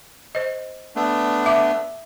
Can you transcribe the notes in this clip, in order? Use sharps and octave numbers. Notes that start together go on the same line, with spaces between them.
C5 D#5
A3 B3 D4
E5 D6